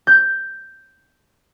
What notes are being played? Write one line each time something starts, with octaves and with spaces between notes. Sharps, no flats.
G6